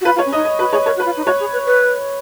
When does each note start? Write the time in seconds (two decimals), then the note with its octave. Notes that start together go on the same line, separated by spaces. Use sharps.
0.01 F#4
0.05 F4 B4
0.16 F4
0.18 C#5
0.26 C#4
0.33 D#4 D#5
0.45 D#5
0.59 F#4 B4
0.72 G#4 C#5
0.86 A#4 C#5
0.97 F#4
1.00 B4
1.06 F4
1.17 D#4
1.26 F#4 C#5
1.40 G#4
1.53 B4
1.66 B4